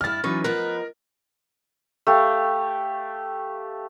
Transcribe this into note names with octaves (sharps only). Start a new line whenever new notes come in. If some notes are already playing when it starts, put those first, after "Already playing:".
G2 E4 F6 A6
E3 F#3 C#4 D#4 B4 C#6
F3 B3 D#4 A#4 B4
A3 G4 F5